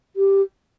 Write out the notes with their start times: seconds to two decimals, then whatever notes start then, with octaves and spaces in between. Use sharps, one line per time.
0.16 G4